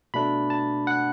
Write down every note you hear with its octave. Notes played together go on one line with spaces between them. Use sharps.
B2 A3 D4 B5
A5
F#5